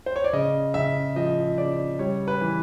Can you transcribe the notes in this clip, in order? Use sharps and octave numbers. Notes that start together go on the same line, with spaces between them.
C5
C#5
D5
C#3 D#5
C#3 E5
F3 D#5
C#3 D5
G3 C#5
B4
E3